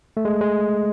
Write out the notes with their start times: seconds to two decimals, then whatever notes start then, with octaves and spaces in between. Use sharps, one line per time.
0.17 A3
0.25 G#3
0.41 G#3